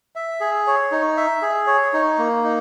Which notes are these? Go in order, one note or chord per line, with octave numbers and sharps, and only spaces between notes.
E5
G#4
C#5
D#4
E5
G#4
C#5
D#4
A#3
D#4